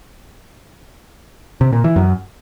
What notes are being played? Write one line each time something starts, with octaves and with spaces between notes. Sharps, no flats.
C3
A#2
E3
F#2